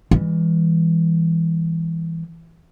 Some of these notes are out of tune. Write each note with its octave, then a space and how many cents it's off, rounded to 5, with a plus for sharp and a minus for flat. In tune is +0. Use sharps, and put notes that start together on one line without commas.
E3 +0 G#3 -40